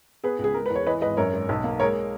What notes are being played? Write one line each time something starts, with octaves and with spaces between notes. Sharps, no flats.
B3 G#4 B4
C#2
G#4
G#3 A#4
E2 B4
C#5
E3 B4 D#5
G#1 B4 D#5
F#2 A#4 C#5
G#1
B1
A#3
G#3 A#4 C#5